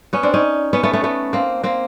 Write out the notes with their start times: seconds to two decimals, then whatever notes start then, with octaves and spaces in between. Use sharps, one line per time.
0.13 B3 C#4
0.23 C4 D4
0.34 C#4 D#4
0.73 B3 C#4
0.83 A3 B3
0.93 A3 B3
1.04 A3 B3
1.33 A#3 C4
1.63 A#3 C4